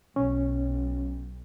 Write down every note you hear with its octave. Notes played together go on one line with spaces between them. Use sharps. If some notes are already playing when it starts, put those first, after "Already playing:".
B1 C#4